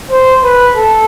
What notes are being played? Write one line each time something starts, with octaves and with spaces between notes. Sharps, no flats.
C5
B4
A4